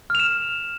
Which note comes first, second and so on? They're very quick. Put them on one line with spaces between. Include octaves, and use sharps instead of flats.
F6 F7 E7